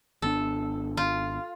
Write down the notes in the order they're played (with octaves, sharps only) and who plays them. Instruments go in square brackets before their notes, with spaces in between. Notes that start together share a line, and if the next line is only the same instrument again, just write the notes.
[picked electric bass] G#1 B3 D4 [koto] A4
[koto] F4